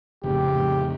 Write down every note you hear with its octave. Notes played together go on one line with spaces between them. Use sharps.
F1 A2 C#3 G4
F2 A2